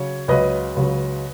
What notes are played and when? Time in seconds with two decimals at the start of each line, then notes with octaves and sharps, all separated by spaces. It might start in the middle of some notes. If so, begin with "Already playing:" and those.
Already playing: C#3 F#3 C#5
0.28 C#2 C#3 F#3 B4 D#5
0.76 C#2 C#3 F#3